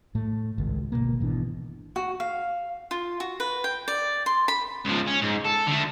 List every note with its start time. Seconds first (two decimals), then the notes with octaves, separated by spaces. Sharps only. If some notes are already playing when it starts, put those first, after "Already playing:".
0.15 A2 A3
0.58 G#1 C#2
0.92 G1 F#2 B2 A#3
1.20 G#1 B2 E3 D4
1.96 F#4
2.20 F5
2.91 F4
3.20 F#4
3.40 B4
3.64 G5
3.88 D5
4.26 C6
4.48 B5
4.85 C#2 F3
5.07 C#4
5.22 G#2
5.44 A4
5.67 D3 A3